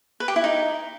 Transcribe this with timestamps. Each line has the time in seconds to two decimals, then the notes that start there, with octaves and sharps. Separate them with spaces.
0.20 B4
0.28 G4
0.36 E4
0.44 D#4